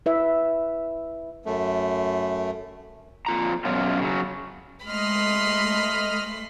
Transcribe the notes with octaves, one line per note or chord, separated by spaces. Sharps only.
E4 B4 E5
F#2 A3
F2 F4 A#5
F#2 B2 C#4 F4
C#3 F#3
G#3 A3 D#5 B5 C6 F6